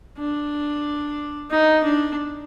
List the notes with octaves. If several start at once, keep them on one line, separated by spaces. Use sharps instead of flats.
D4
D#4
D4